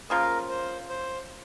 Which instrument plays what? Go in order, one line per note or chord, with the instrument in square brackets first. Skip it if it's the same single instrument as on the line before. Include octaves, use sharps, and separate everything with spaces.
[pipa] C#3 F3 A#3 F4 [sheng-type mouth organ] A#4
[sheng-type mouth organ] C5
C5